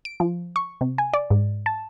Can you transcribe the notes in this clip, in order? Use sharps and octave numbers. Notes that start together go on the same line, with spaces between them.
D7
F3
C#6
C3
G#5
D5
G#2
A5